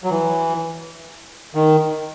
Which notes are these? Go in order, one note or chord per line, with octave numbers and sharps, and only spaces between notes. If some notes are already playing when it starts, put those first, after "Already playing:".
F#3
E3
D#3